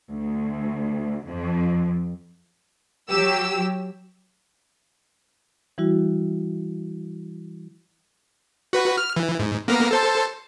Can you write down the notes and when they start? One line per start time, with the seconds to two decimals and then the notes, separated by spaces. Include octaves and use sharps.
0.11 D2
1.26 F2
3.09 F#3 G4 E6
5.78 E3 G3 E4 F#4
8.73 F#4 B4
8.98 F6
9.16 E3
9.39 G#2
9.68 A#3 B3 A#4
9.91 A4 C5 A5